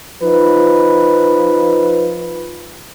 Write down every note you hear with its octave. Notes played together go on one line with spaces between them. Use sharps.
F3 D#4 B4